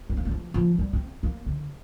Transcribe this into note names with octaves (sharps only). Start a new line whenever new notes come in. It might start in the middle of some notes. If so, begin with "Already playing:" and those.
C4
A#3
G3
F3
F3
G3
C4
A#3
D3